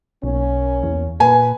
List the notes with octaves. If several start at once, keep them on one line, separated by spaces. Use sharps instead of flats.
B1 A#3 C#4
E2
A#2 B4 G#5